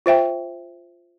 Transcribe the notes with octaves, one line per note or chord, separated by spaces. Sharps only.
F4 C5 E5 G5